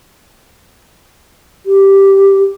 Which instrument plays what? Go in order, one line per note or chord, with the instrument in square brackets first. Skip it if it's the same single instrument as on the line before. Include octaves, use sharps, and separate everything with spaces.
[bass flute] G4